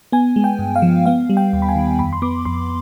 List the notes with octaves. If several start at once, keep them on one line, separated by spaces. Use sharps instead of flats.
B3 G#5
G#3
G5
G2
F5
F3
B3 F5
G3
G5
D#2
B5
G#5
D#3
F2 B5
C6
B3 D6
F2 C6